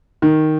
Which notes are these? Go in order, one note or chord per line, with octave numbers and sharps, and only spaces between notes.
D#3